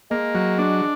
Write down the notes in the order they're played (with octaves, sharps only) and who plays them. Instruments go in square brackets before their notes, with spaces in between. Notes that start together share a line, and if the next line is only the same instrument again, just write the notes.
[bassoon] G#3 [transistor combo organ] A#3
[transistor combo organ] F#3
D4